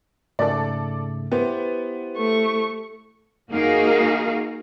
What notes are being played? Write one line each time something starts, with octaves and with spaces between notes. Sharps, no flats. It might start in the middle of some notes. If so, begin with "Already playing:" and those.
G#2 C#3 A3 A4 D5
B3 E4 G4 C5
A3 C#6
A#3 D#4 F#4 G#4 A#4 F5